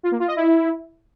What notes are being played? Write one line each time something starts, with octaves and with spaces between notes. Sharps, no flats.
F4
A#3
F4
D#5
E4